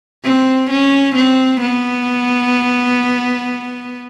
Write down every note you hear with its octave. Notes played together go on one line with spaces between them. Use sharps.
C4
C#4
C4
B3